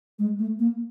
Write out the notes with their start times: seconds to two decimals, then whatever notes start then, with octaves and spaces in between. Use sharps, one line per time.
0.19 G#3
0.39 A3
0.59 A#3